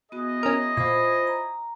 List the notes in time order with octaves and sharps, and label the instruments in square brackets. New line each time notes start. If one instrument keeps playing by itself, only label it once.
[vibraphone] B3 F#4 [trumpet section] E4 G#4 D#5
[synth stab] C#4 A#4
[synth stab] A#2 [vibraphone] F4 C5 B5
[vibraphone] A#5